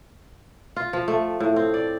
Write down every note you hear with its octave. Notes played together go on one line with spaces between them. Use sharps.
F4
F3
A3
A2
C4
D5